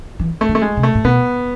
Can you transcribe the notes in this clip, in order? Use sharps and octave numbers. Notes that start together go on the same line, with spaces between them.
E3
A3
D3
A3
G#3
C3
A3
A2
B2 B3